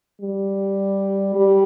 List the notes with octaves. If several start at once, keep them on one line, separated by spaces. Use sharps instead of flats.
G3
G3